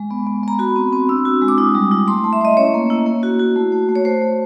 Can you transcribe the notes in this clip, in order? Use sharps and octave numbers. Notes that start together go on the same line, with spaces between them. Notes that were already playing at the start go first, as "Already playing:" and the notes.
Already playing: G#3
B3
B3
B3 A#5
F#4 B5
C4
C4
D4 E6
F#4
G#3
D6
E4 D#6
G3
E4
A3 C6
A3
E5
A3 D#5
C#4 C#5
A#3
E4
A#3
F#4
F#4
A3
A3
A3
C#5
A3 C5
A3